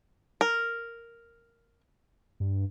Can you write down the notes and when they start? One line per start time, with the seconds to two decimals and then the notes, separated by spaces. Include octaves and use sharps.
0.41 A#4
2.40 G2